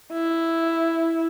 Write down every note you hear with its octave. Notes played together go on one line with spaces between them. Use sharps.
E4